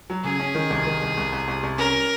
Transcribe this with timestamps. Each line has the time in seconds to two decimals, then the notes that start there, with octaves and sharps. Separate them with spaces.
0.10 F#3
0.24 C#3 G#4
0.40 C#4
0.55 D#3
0.70 C2
0.86 D#3
1.02 C2
1.17 C2
1.33 C2
1.48 C2
1.63 C2
1.78 C#4 A#4